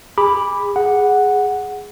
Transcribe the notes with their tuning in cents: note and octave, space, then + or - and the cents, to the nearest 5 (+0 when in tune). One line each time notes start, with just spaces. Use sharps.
G#4 -35 B5 +0 D6 +0
G#4 +0 F#5 +0